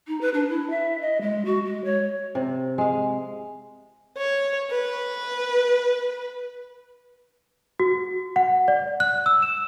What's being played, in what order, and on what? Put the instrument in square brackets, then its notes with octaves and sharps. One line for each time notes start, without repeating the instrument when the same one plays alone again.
[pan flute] D#4
B4
D4
E4
E5
D#5
G#3
F#4
G#3
C#5
[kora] C3
G#3 F5
[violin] C#5
B4
[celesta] F#4
F#5
D5
F#6
E6
E7